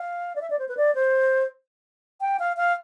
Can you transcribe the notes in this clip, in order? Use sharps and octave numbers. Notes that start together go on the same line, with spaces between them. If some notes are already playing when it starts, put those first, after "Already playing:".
Already playing: F5
D5
E5
D5
C5
B4
D5
C5
G5
F5
F5